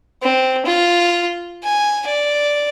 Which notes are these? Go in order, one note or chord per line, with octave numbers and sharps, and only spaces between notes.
C4
F4
G#5
D5